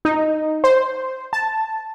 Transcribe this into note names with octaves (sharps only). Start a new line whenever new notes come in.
D#4
C5
A5